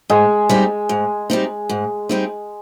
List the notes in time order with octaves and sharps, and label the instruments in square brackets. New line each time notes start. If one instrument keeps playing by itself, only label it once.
[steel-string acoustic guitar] G#2 [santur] G#3
[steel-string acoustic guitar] G3 C4 D#4
G#2
G3 C4 D#4
G#2
G3 C4 D#4